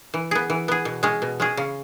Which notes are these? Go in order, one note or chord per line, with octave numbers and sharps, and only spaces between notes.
E3
B3 G#4
E3
B3 G#4
B2
G#3 C#4 G#4
B2
G#3 C#4 G#4
C#3